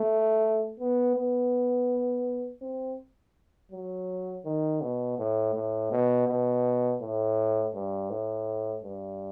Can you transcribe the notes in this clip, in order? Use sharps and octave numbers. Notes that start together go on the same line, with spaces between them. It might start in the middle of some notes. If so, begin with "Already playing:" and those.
Already playing: A3
B3
B3
C4
F#3
D#3
B2
A2
A2
B2
B2
A2
G2
A2
G2